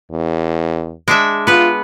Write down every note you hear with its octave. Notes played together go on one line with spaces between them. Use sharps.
E2
G#3 D4 E5
B3 F4 B4